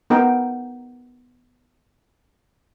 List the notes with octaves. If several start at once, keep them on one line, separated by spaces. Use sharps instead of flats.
B3 D#4 A#4 G5